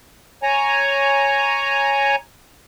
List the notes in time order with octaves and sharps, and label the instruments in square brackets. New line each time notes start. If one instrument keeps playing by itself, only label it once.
[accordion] C#5 G#5 A#5